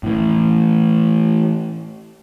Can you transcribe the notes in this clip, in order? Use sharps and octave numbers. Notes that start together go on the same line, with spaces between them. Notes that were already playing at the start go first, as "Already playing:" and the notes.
A2 E3